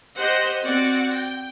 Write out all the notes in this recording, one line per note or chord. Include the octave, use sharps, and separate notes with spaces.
G4 C5 D#5 F#5
C4 F#4 D5 F#5
G5